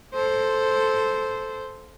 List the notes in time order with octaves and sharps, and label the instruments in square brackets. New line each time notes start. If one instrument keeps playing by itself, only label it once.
[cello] A4 C5